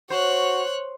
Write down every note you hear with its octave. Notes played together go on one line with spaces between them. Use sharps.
F#4 C5 C#5 F#6